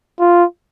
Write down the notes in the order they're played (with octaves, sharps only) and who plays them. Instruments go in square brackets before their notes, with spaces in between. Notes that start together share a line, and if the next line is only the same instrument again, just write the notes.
[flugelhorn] F4